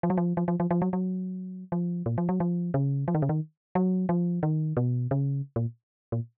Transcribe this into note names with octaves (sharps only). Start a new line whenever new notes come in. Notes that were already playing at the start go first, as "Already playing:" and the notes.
F3
F#3
F3
F3
F3
F3
F3
F#3
F#3
F3
A#2
F3
F#3
F3
C#3
F3
D#3
C#3
D#3
F#3
F3
D#3
B2
C#3
A#2
A#2